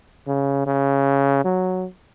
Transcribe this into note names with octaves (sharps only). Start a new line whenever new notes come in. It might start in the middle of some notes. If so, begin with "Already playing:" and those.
C#3
C#3
F#3